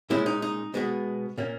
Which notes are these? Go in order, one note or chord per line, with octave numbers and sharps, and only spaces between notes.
A#2 G#3 C#4 E4
D#4
D#4
B2 G#3 B3
A#2 A#3 C#4